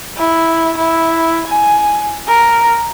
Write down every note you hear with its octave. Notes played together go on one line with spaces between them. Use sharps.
E4
E4
G#5
A#4